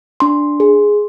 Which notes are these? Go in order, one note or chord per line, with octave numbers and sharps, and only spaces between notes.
D4 C6
G#4